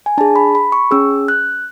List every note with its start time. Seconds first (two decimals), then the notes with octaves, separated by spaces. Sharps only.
0.06 G#5
0.18 D4 A5
0.21 G#4
0.36 B5
0.55 B5
0.72 C#6
0.91 C#4 G#4 E6
1.28 F#6